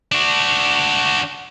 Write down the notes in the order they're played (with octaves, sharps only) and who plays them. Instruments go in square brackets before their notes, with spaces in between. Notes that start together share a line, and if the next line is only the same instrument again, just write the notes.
[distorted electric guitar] D4 F#4